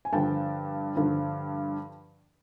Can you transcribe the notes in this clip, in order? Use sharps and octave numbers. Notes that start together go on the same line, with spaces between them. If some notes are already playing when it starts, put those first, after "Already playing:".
G#5
G2 D3 F3 G5 A5
G2 D3 F3